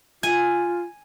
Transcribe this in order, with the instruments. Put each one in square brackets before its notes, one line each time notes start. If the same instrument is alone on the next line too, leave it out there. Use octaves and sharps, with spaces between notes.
[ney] F4 [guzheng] G#5